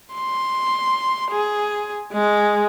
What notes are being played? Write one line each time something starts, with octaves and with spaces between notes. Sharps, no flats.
C6
G#4
G#3